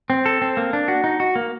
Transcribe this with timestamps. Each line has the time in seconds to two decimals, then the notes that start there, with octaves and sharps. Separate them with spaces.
0.10 C4
0.26 A4
0.42 C4
0.57 A#3
0.73 D4
0.88 F#4
1.04 D#4
1.20 F#4
1.36 A#3